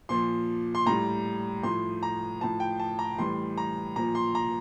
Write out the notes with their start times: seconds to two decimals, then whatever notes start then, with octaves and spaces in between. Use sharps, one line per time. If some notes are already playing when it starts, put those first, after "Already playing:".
0.09 A#2 F3 C6
0.75 C6
0.86 A2 G3 A#5
1.63 A2 F3 C6
2.03 A#5
2.41 A2 F3 A5
2.60 G5
2.79 A5
2.99 A#5
3.18 A2 E3 G3 C6
3.57 A#5
3.96 A#2 F3 A#5
4.15 C6
4.35 A#5